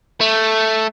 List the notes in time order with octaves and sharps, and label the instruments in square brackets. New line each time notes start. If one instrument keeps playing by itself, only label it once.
[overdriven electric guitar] A3